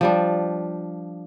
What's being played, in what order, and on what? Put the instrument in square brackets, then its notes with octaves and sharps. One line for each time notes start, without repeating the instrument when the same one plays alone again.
[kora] F3 G3 D4